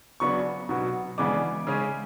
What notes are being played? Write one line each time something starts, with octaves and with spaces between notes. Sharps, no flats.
C#3 F#3 B3 D4 C#6
B2 F#3 B3
C#3 E3 G#3 B3 D4 D6
C#3 G#3 C#4